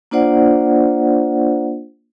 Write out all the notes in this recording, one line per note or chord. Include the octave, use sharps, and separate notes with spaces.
A#3 D4 F4 C5 D5 F#5